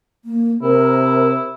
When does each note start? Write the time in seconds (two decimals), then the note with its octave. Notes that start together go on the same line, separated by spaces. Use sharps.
0.25 A#3
0.62 C3 E4 A#4 C5